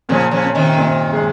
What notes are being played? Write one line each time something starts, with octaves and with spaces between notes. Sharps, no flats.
A#2 C#3 F3
C#3 F3
C#4
C3 D#3
A#2
G#3